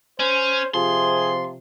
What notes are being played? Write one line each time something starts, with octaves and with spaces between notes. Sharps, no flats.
C#4 C5
C3 F3 G#4 C6